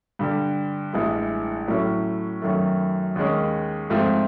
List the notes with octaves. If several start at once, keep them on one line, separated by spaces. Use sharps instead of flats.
G2 D3 G3
A1 G2 E3 G#3
A2 F#3 A3 C#4
F#2 D#3 F#3 A3
D#2 D#3 G#3 C#4
G#2 F3 A3 C4 F4